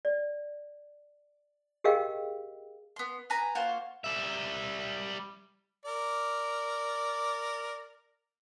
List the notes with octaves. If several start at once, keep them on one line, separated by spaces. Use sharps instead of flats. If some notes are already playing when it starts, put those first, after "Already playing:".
D5
G4 G#4 A#4 D#5 F5 G5
B3 C6
B4 G#5 A#5
A#3 F4 F#4 C5
G3 E5
A#4 D5